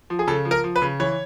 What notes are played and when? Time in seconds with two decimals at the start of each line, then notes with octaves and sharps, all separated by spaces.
0.10 F3
0.19 G#4
0.27 C#3 A4
0.45 F3
0.51 A#4
0.64 F3
0.76 B4
0.82 C#3
1.00 E3 C#5